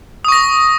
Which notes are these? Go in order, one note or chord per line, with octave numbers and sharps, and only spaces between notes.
C#6 D#6 A#6